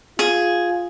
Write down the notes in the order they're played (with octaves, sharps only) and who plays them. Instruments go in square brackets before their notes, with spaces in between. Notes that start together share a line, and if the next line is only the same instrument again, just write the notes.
[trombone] F4 [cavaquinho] G#4